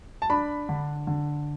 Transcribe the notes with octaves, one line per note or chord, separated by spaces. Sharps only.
A5
D4 B5
D3
D3